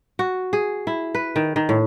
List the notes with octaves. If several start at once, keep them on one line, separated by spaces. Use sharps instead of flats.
F#4
G#4
E4
B4
D#3
D#3
A2